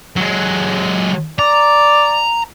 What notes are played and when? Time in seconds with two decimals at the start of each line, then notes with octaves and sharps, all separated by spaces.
0.17 F#3 G#3
1.39 D5 A#5